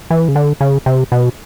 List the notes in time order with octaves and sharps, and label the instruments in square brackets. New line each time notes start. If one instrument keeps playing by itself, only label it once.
[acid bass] E3
C#3
D3
C#3
C3
B2